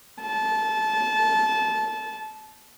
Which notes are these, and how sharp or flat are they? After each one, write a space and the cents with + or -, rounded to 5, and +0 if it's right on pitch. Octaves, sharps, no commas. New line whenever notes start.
A5 -20